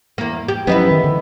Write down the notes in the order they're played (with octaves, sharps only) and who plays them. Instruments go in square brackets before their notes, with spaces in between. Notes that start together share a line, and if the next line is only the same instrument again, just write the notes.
[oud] E2 A#3
G4
[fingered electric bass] F3 F#3 C#4 [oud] B3 D#4 E4
[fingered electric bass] D#3
D3 E3